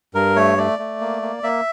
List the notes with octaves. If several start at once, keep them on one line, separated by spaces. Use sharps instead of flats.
G2 A#4
A3 C#5
A3 D5
A3
A#3
A#3
A#3 E5